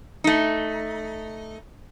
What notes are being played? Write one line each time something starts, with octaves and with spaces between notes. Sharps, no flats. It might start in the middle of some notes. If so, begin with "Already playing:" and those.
A3 D#4